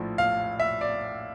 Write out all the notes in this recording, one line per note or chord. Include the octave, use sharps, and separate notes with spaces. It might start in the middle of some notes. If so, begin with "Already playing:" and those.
Already playing: A#1 A2 F3
F5
E5
D5